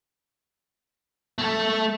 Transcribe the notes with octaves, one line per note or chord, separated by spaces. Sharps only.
A3 A4